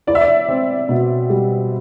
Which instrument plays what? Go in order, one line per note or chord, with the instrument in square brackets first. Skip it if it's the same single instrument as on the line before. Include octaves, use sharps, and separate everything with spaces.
[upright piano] E4 [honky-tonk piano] D5
[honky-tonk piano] E5
D5
[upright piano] C4
B2
G3